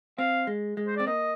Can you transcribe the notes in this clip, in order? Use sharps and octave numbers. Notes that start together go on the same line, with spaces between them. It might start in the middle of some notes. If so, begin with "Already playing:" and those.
C4 F5
G#3
G#3
C5
C4 D5
A#3 D#5